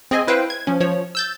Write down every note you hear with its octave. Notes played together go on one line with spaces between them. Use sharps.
C4 G#4 D#5 G#5
E4 B4 C5 F5 G5
G#6
F3 C#4
F3 C#5
E6 G6 A6